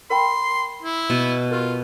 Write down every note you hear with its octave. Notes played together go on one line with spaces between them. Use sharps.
A#4 G5 B5 C6
E4
B2
F4 G4 A#4